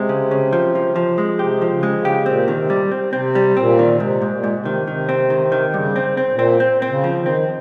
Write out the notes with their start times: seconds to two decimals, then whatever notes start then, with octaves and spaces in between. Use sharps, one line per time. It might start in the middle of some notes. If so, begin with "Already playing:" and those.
Already playing: C3 G#3
0.09 C#3
0.31 C#3
0.53 F3
0.75 F3
0.96 F3
1.18 G#3
1.39 C3 G4
1.62 F3
1.69 C#3
1.83 G#3
1.98 C#3
2.05 G4
2.26 A#2 C4
2.48 D#3
2.56 C3
2.70 G3
2.91 C4
3.13 C3 C4
3.35 G3
3.57 A#2 C4
3.79 D#3
4.00 G#2 C3
4.22 G#2
4.29 A#2
4.44 G#2
4.58 C3
4.65 D#3
4.87 C3 D#3
5.09 C4
5.30 D#3
5.52 D#3
5.74 G2 C#3
5.96 C4
6.17 C4
6.32 A#2
6.39 C4
6.60 C4
6.82 C4
6.89 C#3
7.04 F3
7.19 D#3
7.26 C4